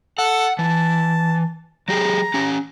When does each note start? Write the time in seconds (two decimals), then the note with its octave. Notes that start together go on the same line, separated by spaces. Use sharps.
0.18 A4 F#5
0.59 E3 A5
1.88 F#3 G4 G#4 A#5
2.34 C#4 G4